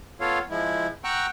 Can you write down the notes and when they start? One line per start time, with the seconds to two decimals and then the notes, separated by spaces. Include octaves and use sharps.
0.21 B3 F4 A4 C#5 F5
0.50 F3 G#3 E4
1.04 F#5 G5 A#5 C#6 E6 F#6